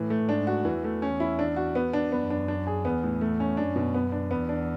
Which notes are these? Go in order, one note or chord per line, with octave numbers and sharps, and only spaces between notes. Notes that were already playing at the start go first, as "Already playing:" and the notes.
Already playing: A2 E3
A3
G#2 D4
F#4
E2 E3
A3
C#4
E4
D4
F#4
B3
D4
F#2 B3
D4
D4
G#4
E2 B3
A2
A3
C#4
F#2 D4
B2
B3
D4
E2 B3
D4